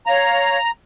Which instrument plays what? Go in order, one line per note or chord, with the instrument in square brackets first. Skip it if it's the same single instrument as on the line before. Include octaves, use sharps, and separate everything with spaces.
[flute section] C#5 F5 [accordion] A#5